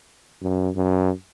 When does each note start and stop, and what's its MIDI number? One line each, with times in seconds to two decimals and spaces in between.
0.42 0.69 42
0.75 1.10 42